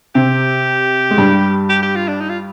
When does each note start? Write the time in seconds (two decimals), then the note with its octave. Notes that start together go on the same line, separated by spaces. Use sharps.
0.15 C3 C4 G4
1.11 G#3
1.18 G2 G3
1.70 G4
1.83 G4
1.96 F4
2.08 D4
2.21 D#4
2.30 F4